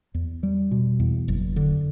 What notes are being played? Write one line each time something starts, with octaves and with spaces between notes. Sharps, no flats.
E2
G3
B2
E2
F#1
D3